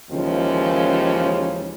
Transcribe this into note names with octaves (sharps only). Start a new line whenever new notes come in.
D#2 C#3 E3 F3 G#3 C#4